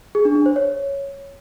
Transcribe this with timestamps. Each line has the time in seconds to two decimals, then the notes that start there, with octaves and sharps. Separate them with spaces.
0.15 G#4
0.25 D4
0.35 D4
0.46 C5
0.56 C#5